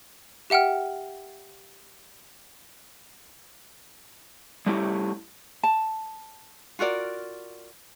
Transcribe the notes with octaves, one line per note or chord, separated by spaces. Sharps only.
G4 E5 F#5 G5 F6
G3 A3 C#4 E4 G4
A5
F4 F#4 A#4 D5